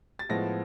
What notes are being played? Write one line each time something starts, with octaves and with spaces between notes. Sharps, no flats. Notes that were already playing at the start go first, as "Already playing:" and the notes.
A6
A2 F3 G#3 B3 A#6